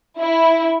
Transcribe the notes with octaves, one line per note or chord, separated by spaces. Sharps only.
E4